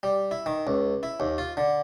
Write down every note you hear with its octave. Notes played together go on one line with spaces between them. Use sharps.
G3
E4
D#3
C#2
E4
D#2
F4
D3